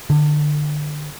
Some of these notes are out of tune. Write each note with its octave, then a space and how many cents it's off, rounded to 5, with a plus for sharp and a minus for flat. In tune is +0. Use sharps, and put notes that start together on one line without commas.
D3 +25